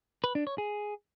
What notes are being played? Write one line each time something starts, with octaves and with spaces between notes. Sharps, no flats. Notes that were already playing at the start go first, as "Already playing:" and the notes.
B4
D4
C#5
G#4